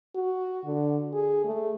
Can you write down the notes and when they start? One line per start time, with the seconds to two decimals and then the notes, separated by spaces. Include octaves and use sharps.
0.15 F#4
0.65 D3
1.13 G#4
1.45 A3